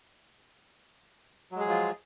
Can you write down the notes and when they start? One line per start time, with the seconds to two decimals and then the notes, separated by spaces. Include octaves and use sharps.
1.51 F#3
1.56 G#3
1.61 G#4
1.65 F3
1.70 F4